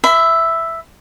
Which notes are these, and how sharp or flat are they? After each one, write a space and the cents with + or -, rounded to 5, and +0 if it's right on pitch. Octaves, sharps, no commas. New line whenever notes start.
E5 +0 B5 +30